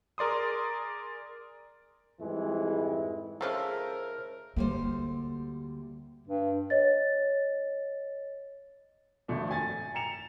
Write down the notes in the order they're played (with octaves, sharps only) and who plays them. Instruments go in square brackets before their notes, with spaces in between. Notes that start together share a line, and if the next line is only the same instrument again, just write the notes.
[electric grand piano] G#4 A#4 D5 C6 D#6
[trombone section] F2 G#2 E3 G3 G#3 E4
[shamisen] C#3 F3 G#3 [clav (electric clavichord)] A4 C#5 E5 [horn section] A#4 [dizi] C5
[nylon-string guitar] D2 G3 C5 [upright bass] A#3
[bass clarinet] G2
[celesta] C#5 D#5 A6
[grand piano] G#1 F2 A3 D4
G#5 A6
A#5 C#7 E7 F7